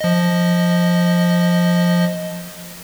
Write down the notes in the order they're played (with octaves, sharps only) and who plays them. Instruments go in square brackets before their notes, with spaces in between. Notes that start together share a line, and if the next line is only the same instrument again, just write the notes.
[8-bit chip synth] F3 D#5